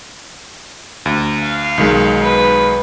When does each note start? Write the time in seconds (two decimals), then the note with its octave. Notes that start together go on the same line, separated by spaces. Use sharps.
1.06 D2
1.41 F5
1.78 B1 D#3 G#3
2.22 B4